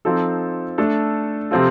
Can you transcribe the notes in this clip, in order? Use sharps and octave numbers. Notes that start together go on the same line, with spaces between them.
F3 C4 D#4 A4
A3 D4 A4
C3 F3 C4 F4 A4